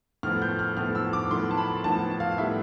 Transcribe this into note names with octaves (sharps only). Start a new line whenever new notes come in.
A2 F3 B3 F6
G6
F6
A2 F3 B3 F6
E6
D6
A2 F3 B3 C6
A5
B5
A2 F3 B3 A5
F5
A2 G3 B3 E5